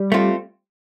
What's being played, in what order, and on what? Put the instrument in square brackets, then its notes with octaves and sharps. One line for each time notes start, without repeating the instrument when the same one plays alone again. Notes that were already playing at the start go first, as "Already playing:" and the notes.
Already playing: [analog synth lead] G3
[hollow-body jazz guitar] A3 C4 F4